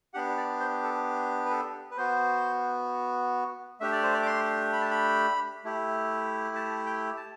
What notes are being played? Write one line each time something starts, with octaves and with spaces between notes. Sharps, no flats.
B3 D4 G4 F#5
D5
C5
A4
B4
A4
B4
B3 F#4 C5
A3 D4 G4 E5
D5
C5
D5
D6
C6
B5
A5
B5
A3 E4 G4
A5
G5
A5